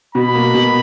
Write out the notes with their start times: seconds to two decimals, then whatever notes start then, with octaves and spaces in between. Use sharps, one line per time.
0.15 B2 B5
0.35 A#3
0.54 B2